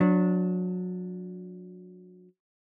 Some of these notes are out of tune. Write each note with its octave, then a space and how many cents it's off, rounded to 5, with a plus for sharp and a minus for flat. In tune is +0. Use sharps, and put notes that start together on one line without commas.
F#3 -30 D4 -10